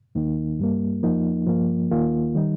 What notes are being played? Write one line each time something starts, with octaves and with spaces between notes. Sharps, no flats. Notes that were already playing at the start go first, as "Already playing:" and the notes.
D#2 D#3 A#3 D#4
G2 G3 A#3
F2 F3 A#3 D#4
G2 F3 A#3
D#2 D#3 A#3 F4
D#3 G3 D#4